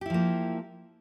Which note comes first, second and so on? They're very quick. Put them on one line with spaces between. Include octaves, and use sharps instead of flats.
G4 E4 F3 A#3